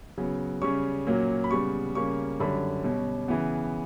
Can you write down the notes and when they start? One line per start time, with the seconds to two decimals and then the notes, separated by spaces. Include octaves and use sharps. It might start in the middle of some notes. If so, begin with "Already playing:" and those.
0.17 C#3 F#3 B3
0.62 C#3 G3 C#4 C#6
1.07 A#2 F#3 A#3 C#4
1.44 B5
1.51 C#3 G3 B3 C#6
1.95 C#3 G3 A#3 C#4 C#6
2.40 F#2 D3 G3 C#4 B5
2.84 B2 G3 C#4
3.28 C#3 E3 B3